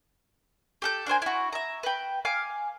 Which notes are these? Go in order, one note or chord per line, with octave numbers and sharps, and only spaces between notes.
G4 A4 G6
D4 A#4 C5 G#5
E4 F#4
E5 A#5
B4 G5
F5 G#5 D6 F6